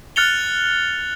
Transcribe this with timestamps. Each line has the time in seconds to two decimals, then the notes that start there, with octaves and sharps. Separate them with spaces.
0.16 F6 F#6 A6 C#7 F7 G7